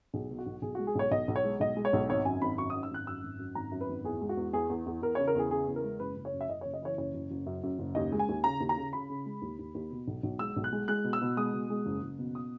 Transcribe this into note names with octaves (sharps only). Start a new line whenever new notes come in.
B1 G#4
B2
F#4
B1
B1 G#4
F#4
G#3
G#4
B1 C#5
B1 D#5
B1
C#5
G#3
B1 D#5
G#3
C#5
B1
G#1 C#5
F#2 G#5
G#1 B5
F#2 C#6
D#6
F#2
E6
G#1 F#6
F#2 E6
G#1
F#2
G#1 A#5
F#2
B4
G#1
E2 G#4
G#3
F#4
E2
E2 G#4
E2
E2
E2 A#4
C#3 C#5
A#4
E2 G#4
C#3 G#4
E2
A#4
G#3
F#1 B4
F#1
C#5
F#2
E5
F#1 D#5
C#5
F#1
D#5
E3 C#5
F#1 C#5
F#1
F#1
F#2
F#2
F#1
D#2 D#5
G#3
G#5
D#2
C#3 A#5
D#2
A#5
C#3
C#3 B5
C#3
G#3
D#2
D#2
D#2
B2
B1
B1
G#3 E6
B1
F#6
G#3
G#3 F#6
B2
E6
B2
G#3 D#6
B2
G#3
F#1
F#1
B2
D#6